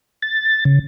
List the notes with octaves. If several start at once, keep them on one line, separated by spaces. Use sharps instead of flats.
A6
C#3